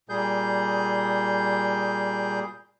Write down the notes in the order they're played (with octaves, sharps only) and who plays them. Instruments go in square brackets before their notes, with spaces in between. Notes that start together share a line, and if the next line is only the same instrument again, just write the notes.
[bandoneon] A#2 G3 G#4 G6